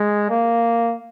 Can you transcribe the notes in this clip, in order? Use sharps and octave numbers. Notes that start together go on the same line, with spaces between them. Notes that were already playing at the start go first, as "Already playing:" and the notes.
Already playing: G#3
A#3